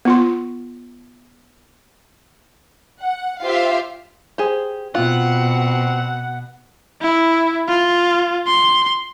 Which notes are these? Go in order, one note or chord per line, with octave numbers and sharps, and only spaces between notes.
B3 F4 C6
F#5
F4 G4 C5 E5 F5
G4 G#4 C5
B2 C4 F4 F#5
E4
F4
C6